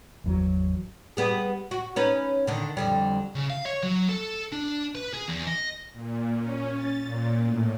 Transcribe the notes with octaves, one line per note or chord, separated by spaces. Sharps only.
G#1 E2 F#3
G3 B3 G#4
F#4
C#4 D#4 B4
D3 D#3
F2 D3 G3
C#3
F5
C#5
F#3
A4
D4
B4
G#4
E2
D#5
A#2
C#4
A6
A#2
A2